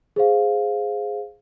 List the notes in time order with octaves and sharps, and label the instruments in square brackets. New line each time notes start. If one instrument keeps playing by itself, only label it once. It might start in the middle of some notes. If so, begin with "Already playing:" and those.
[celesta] G#4 C5 F5